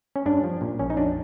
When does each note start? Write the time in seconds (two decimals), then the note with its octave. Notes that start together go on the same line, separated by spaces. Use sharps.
0.16 C#4
0.26 G2 D4
0.44 F3
0.61 A#2
0.79 A#1 C#4
0.90 D#4
0.97 F2 D4